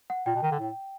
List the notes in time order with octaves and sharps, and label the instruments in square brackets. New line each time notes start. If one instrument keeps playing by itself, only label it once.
[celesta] F#5
[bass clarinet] A#2 [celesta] G5
[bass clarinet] B2
D#3
D3
A2